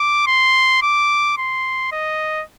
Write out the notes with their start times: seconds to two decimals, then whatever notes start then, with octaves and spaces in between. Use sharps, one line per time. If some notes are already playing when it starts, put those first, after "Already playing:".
Already playing: D6
0.27 C6
0.82 D6
1.38 C6
1.92 D#5